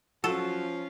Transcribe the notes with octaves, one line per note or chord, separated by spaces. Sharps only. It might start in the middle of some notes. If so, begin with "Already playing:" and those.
F3 F#3 C#4 F4 F#4 A4